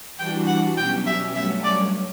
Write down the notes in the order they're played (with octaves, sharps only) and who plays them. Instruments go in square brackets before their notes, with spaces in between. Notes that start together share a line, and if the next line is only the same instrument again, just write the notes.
[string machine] E3 G3 D4 F#4 [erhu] G5
[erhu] F#5
[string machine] B2 F#3 C#4 G4 [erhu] G5
[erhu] E5
[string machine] G2 F#3 A3 C#4 [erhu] E5
[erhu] D5